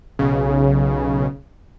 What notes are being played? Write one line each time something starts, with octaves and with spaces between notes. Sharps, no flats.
B1 C#3